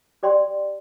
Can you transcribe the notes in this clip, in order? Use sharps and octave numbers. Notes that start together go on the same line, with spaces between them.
G4 D5 G5 C6